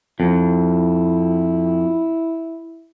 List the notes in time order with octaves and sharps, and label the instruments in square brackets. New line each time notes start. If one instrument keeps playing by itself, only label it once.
[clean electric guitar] F2 [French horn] E4